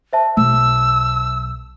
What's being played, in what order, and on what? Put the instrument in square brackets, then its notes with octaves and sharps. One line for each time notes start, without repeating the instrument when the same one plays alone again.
[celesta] C5 E5 A5
[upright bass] B1 [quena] E6